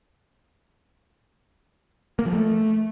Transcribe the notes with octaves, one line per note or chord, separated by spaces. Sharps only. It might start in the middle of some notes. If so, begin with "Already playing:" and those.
A#3
F3
A3